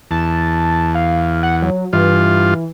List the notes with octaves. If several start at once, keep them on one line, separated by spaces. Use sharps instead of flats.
E2 A5
F5
F#5
F#3
G2 E3 F4